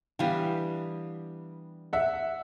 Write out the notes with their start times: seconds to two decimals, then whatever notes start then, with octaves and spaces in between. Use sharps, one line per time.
0.19 E3 G3 B3 D4 F5 G5
1.93 E5 F#5